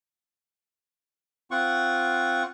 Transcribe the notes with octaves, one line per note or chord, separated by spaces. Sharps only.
C4 F4 F#5 C#6